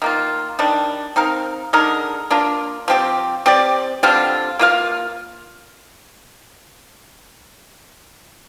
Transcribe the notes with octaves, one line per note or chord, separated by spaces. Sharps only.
D#3 A#3 F4
D#3 G3 D4
C4 D#4 A#4 F5
D3 G#3 D#4 A#4
A#3 D4 F4
F3 C4 G4
C4 G4 D5
D3 G3 C4 F4
A#3 F4 C5 F5